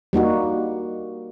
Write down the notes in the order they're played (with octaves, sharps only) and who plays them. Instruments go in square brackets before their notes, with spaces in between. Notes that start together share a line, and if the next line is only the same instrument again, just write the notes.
[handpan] G3 A#3 D#4 F#4